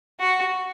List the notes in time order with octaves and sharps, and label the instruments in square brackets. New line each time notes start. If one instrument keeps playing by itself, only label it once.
[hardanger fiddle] F#4